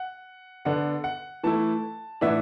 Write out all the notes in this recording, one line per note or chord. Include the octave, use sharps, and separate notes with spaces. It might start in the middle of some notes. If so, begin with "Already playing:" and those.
Already playing: F#5
D3 B3 D4 F#5
F#5
E3 A3 E4 A5
A2 E3 B3 D4 E5